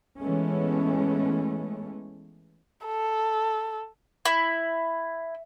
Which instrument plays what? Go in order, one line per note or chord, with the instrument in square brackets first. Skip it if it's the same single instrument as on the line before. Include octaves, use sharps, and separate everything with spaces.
[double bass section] E3 G#3 A3 B3 C#4
[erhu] A4
[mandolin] E4